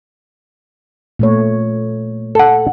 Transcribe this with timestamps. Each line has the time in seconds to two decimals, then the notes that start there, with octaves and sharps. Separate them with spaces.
1.19 A#2 A3 C#5
2.35 A4 F#5